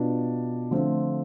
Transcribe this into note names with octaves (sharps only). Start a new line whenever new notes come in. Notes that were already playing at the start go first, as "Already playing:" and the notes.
Already playing: B2 B3 D4 F4
D3 F3 A3 C4 F4